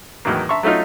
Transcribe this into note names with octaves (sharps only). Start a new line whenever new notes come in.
E2 A2 D#3 F#3 A#3
E5 A5 A#5 C6 C#6
F#3 A3 C#4 D#4 F4